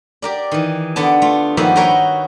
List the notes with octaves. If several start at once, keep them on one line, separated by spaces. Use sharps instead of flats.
G4 A#4 D5
D#3 E3
D3 B3 D5 A5
A3 F4
G2 D#3 F3 A#3 F#4 E5
F#4 A#4 B4 C#5 G5